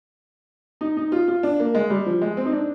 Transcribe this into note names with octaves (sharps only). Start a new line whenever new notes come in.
D#4
D#4
F4
F4
D4
A#3
G#3
G3
F3
G#3
C4
D#4
D4